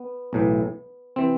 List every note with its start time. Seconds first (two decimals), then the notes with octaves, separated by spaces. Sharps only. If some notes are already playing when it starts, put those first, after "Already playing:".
Already playing: B3
0.33 B1 A2 E3
1.16 C3 E3 C4